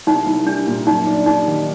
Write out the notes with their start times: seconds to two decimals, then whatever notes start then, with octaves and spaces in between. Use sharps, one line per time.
0.07 C2 D#4
0.26 C2
0.47 G3 D4
0.67 A#2
0.86 F#2 D#4
1.06 D4
1.26 G3 D#4
1.47 D#3